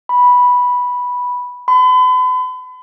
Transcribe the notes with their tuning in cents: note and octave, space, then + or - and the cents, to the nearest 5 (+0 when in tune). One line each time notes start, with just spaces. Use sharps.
B5 -5
B5 +40